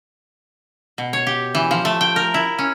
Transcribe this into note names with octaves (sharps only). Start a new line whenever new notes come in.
B2
C#5
G4
E3
F3
A3
G5
A#4
E4
C#4